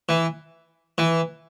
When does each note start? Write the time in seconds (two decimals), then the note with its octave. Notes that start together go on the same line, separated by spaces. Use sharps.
0.09 E3
0.98 E3